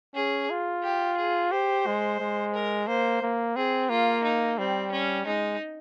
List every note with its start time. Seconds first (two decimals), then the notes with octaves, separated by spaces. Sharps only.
0.15 C#4 G#4
0.50 F4
0.83 G4
1.17 G#4
1.52 G4 C5
1.86 G#3
2.20 G#3
2.54 A#4
2.87 A#3 C5
3.22 A#3
3.56 C4 G#4
3.89 A#3 F4
4.24 D#4
4.58 G3 C4
4.91 C#4
5.26 G#3 D#4